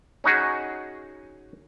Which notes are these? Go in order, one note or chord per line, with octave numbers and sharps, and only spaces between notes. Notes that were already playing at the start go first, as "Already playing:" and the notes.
C#4 D#4 F#4 G#4